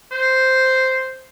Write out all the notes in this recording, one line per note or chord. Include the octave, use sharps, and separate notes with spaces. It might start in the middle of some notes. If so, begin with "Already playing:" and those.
C5